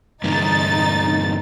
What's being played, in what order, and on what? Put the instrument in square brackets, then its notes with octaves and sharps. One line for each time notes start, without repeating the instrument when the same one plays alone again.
[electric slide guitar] G2 D3 E3 [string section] D#4 A6